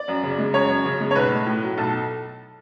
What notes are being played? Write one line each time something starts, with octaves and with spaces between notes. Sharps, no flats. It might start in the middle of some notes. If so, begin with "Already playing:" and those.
Already playing: D5
F#2
C#3
G#3
F#2 C#5
F#2
C#3
G#3
C#5
B1 B4
A3
A2
F#3
B1 A4